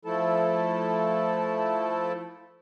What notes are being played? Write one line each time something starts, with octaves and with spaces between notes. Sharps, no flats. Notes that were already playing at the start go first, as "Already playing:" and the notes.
F3 A3 E4 A4 A5